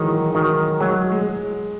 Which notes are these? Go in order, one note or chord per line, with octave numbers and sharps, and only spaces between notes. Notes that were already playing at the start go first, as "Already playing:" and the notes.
Already playing: D#3 E3 F#3 G#3
D#3 F#3
F#3 G#3
G#3